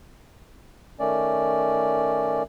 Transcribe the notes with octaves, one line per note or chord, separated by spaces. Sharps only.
D#3 A3 C#4 D5